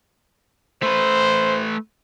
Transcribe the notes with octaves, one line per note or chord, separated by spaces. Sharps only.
A3 B4 C5